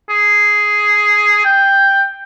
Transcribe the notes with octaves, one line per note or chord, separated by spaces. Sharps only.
G#4
G5